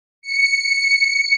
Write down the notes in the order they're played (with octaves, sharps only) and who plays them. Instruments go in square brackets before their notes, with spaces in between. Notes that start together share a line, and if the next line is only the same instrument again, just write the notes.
[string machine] C#7